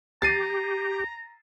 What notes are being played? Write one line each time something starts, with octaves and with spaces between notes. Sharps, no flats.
G4 A#5 A6 C7 D#7